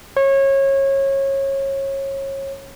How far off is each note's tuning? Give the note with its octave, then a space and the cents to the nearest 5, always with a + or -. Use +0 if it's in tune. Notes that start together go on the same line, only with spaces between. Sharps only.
C#5 -25